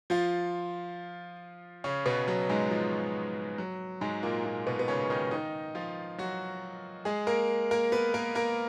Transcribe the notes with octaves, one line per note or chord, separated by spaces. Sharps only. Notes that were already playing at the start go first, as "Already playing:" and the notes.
F3 F4
C#3 C#4
B2 B3
F#3
G#2 G#3
F3
F#3
G#2 G#3
A#2 A#3
A#2 A#3
B2 B3
B3
C#3 C#4
D#3 D#4
D#3 D#4
F3 F4
F#3 F#4
G#3 G#4
A#3 A#4
A#3 A#4
B3 B4
A#3 A#4
A#3 A#4